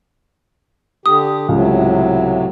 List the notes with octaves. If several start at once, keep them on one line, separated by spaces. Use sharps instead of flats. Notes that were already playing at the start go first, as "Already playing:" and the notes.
D3 G4 D#6
C#2 A2 C3 F#3